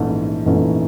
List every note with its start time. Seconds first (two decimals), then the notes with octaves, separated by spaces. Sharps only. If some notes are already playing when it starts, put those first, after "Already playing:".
Already playing: A#1 G#2 E3 A3 C#4
0.46 A#1 G#2 E3 A3 C#4